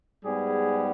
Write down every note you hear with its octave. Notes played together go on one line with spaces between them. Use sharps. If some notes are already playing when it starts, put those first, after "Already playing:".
G#2 G3 B3 G#4